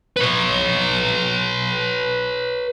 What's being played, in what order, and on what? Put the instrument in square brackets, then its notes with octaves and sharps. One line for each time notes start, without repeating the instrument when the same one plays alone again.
[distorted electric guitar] B4 C#5